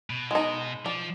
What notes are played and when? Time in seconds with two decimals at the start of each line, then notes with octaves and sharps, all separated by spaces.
0.10 B2
0.31 G#3 D#4
0.86 F3 D5